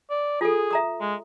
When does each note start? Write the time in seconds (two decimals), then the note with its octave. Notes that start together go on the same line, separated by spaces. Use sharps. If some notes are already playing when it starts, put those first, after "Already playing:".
0.10 D5
0.41 F4 G#4 A4
0.71 E5 A#5 D#6
1.01 G#3